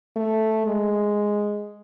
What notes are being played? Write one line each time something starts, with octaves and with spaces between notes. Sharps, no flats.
A3
G#3